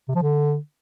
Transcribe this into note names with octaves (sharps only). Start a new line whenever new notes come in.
C3
F3
D3